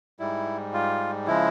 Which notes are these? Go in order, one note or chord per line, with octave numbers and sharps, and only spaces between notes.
G#2 G3 E4
F4
C#3 F3 G#3 E4